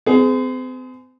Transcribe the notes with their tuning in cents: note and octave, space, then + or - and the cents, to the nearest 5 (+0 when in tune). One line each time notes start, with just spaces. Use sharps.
C4 -40 G#4 +20